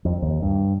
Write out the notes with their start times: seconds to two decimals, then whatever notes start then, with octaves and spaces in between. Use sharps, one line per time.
0.05 F2
0.22 D#2
0.42 G2